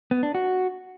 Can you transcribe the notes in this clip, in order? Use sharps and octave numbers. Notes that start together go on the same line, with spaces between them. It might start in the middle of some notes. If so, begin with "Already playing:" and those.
B3
D4
F#4